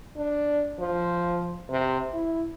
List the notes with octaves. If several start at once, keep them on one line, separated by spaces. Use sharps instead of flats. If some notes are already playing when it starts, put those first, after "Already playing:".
D4
F3
C3
E4